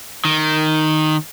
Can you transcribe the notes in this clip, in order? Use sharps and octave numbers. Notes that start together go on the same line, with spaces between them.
D#3